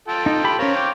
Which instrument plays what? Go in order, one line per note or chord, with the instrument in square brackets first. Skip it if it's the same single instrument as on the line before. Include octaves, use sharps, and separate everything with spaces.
[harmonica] F4 A4 G5
[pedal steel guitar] D#4
G4 B5
[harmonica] C4 C#5 F5 [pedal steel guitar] C#4 A#4
[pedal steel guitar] G5 D6